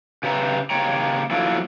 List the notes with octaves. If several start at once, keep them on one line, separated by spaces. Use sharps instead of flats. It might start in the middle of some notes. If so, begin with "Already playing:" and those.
C#3 G4 B4 E5 A#5
C#3 A#3 G4 C#5 G5 A#5
F3 F#3 A3 A#3 D4 E4